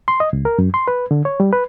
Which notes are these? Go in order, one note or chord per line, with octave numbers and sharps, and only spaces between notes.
C6
D#5
C#2
A#4
F#2
C6
B4
D3
C#5
G3
B4